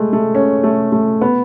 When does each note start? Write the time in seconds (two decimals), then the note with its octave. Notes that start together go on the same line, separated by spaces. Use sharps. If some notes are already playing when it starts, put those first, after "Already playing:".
Already playing: G#3 A3
0.13 A3
0.35 C#4
0.64 A3
0.92 A3
1.21 B3